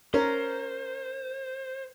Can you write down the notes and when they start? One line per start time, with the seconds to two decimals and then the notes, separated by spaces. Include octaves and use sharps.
0.14 C#4 A#4 C5